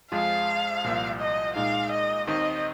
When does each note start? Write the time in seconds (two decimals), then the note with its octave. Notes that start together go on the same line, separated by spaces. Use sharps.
0.12 F2 F3 G#3 F4 F5
0.84 C2 A#2 F3 A#3 F4
1.20 D#5
1.55 A#2 G#3 D#4 F5
1.92 D#5
2.27 D#2 D#3 C4 D#4 D#5